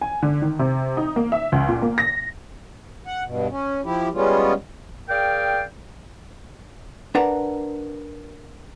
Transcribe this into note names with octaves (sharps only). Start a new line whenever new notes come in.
G#5
D3
D#3
C3
D#4
A#3
E5
C#2
A#2
A#3
A#6
F#5
G2 B2
C#4
F3 E4 G4
G3 G#3 B3 C#4 F4
G#4 A#4 D5 F5 G5
D4 A#4 B4 F#5 A#5